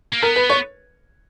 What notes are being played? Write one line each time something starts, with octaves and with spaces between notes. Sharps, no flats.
A#3
B3 A#4
B4
C#5